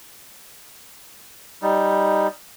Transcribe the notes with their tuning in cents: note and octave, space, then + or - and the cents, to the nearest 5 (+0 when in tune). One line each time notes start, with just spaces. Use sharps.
G3 +0 D#4 +0